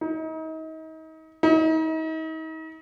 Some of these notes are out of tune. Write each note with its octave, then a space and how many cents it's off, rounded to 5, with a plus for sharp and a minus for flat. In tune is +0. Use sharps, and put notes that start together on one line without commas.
D#4 +35
D#4 +40